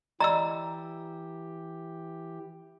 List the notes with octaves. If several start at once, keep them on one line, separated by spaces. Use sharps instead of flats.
E3 G4 D5 D#5 A#5 E6